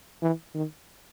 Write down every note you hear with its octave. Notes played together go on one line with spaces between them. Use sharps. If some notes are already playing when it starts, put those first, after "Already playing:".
E3
D#3